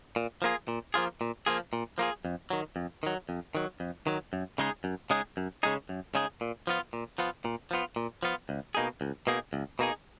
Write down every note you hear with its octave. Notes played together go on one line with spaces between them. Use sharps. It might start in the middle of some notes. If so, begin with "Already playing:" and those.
A#2
F3 A#3 F4 G#4
A#2
F3 A#3 F4 G#4
A#2
F3 A#3 F4 G#4
A#2
F3 A#3 F4 G#4
F2
D#3 F#3
F2
D#3 F#3
F2
D#3 F#3
F2
D#3 F#3
F#2
C#3 G#3 D#4 G#4
F#2
C#3 G#3 D#4 G#4
F#2
C#3 G#3 D#4 G#4
F#2
C#3 G#3 D#4 G#4
A#2
F3 B3 F4
A#2
F3 B3 F4
A#2
F3 B3 F4
A#2
F3 B3 F4
C#2
B2 A#3 D#4 G#4
C#2
B2 A#3 D#4 G#4
C#2
B2 A#3 D#4 G#4